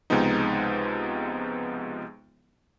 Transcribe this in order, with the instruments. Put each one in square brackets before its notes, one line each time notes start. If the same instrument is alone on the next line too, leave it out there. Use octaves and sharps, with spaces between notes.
[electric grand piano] C#2 C3 F3 G#3 B3 D#4